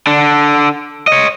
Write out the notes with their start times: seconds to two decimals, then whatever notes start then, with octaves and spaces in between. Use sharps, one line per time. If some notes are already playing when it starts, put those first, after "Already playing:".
0.07 D3 D4
1.08 C#5 D#5